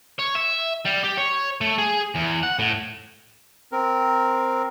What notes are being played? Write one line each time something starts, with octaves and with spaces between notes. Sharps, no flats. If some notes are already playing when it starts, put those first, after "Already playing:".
C#5
E5
G3
G4
C#5
A3
G#4
E2
F#5
A2
C4 A#4